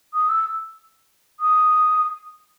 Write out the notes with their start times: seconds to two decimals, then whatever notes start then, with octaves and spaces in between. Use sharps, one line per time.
0.14 D#6
0.29 E6
1.40 D#6